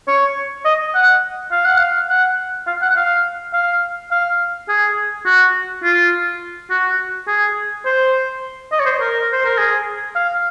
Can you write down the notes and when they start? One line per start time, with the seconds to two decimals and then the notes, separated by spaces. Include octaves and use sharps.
0.07 C#5
0.65 D#5
0.95 F#5
1.52 F5
1.65 F#5
1.78 F5
2.09 F#5
2.67 F5
2.82 F#5
2.96 F5
3.53 F5
4.11 F5
4.69 G#4
5.26 F#4
5.84 F4
6.70 F#4
7.28 G#4
7.85 C5
8.72 D#5
8.80 C#5
8.85 C5
9.00 A#4
9.32 C5
9.45 A#4
9.58 G#4
10.15 F5